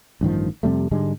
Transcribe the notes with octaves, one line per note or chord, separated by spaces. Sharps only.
A1 G2 D#3 F3
F2 C3 G3 A3
G#2 D3 G3 G#3